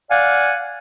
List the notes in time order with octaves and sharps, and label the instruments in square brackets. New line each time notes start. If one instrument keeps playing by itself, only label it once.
[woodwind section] D5 F5 F#5 G#5